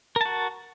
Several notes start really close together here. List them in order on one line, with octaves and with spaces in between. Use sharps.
A#4 A5 F#4